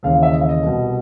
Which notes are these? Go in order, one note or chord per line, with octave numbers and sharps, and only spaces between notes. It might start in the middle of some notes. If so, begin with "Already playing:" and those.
D#2 C#3 E3 F5
F5
E5
D#5
E5
D#5
C2 B2